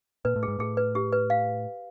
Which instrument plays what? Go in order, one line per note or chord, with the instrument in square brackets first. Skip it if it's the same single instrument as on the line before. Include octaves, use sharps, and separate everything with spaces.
[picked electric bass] A#2 [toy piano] B4
[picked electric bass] A2
[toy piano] G#4
[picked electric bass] G#2
[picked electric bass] A2 [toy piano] G#4
[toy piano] B4
G4
B4
F5